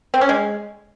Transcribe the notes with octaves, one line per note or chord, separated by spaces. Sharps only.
C4
C#4
G#3